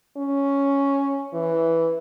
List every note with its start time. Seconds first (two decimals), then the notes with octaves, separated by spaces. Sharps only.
0.17 C#4
1.34 E3